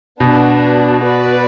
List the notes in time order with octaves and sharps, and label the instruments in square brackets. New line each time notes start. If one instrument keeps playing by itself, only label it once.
[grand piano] B2 [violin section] B3 D4 F#4
[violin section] B3 F#4 B4 D5